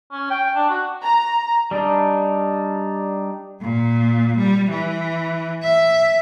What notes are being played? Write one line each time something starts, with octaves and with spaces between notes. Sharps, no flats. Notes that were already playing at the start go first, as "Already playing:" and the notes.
C#4
G5
D4
F#4
A#5
G3 D4 D#4
A#2
G3
E3
E5